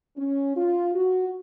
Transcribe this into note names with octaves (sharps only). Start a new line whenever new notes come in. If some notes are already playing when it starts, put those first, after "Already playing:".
C#4
F4
F#4